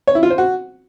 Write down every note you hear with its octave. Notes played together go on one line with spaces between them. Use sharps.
C#5
E4
F4
C5
F#4